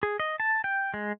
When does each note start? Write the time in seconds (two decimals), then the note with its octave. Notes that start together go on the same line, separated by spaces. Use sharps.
0.03 G#4
0.20 D#5
0.40 A5
0.64 G5
0.94 G#3